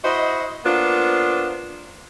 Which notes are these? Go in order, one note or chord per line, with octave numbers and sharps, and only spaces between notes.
E4 F#4 C5 D#5
A#3 B3 D4 F4 C5